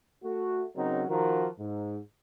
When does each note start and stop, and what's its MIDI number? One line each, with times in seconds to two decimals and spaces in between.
0.23 0.63 57
0.23 0.63 66
0.76 1.03 49
0.76 1.03 54
0.76 1.03 60
0.76 1.03 63
0.76 1.03 70
1.09 1.47 51
1.09 1.47 53
1.09 1.47 66
1.09 1.47 70
1.59 1.97 44